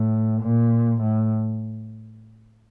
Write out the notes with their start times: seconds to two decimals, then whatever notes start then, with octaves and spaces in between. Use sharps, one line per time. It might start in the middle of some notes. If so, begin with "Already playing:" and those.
Already playing: A2
0.42 A#2
1.02 A2